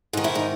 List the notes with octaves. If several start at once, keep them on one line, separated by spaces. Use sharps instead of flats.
G#2 D#3 D#4
E4
D#4